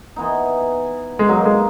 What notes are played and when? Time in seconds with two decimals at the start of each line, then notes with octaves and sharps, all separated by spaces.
0.16 E3 B3 D#4
1.19 G#3
1.29 B2 F#3 A#3 D#4
1.45 G#3